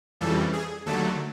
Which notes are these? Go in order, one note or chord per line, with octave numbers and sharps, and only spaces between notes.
F2 C#3 E3 G3 A4
G#4
D#2 D3 F#3 A3 A4